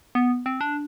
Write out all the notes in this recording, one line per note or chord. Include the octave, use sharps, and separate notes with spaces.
B3
C4
D4